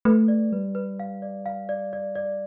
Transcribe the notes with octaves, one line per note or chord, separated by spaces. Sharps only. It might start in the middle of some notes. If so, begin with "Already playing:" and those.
A3 B4
D5
G3 B4
B4
F5
D5
F5
D5
D5
D5